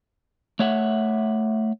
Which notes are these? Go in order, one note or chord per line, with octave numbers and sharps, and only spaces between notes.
A3 C#5 E5 F#5